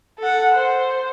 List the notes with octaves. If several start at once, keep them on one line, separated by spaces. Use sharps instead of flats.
A4 F#5
C5